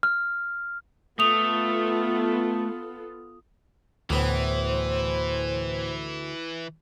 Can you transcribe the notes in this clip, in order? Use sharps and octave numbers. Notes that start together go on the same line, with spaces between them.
F6
A3 B3 F4 A4 D#6 F7
D2 A2 E3 B3 C5